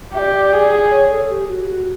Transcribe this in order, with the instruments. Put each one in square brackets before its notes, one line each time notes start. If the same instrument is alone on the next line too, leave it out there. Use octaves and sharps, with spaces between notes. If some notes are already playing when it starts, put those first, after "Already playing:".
[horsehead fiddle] G4 [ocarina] D5 E5
[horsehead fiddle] G#4
[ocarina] C#5
A4
G4
F#4
F#4